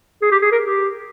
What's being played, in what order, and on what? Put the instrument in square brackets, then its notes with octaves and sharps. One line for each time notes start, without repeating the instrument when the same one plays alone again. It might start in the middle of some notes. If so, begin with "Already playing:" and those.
[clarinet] G#4
G4
G#4
A#4
G4